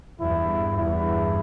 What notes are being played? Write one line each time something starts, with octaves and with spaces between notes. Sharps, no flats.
E2 G2 E4
E2 G2 E4